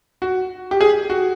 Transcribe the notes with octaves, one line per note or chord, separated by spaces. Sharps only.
F#4
G4
G#4
F#4